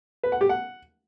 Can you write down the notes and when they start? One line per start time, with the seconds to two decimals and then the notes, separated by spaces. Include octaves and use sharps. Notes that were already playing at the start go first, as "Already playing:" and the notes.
0.23 B4
0.32 F#5
0.41 G4
0.49 F#5